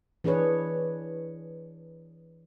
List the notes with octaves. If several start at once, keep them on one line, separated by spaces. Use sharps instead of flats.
E3 D4 G#4 B4 C#5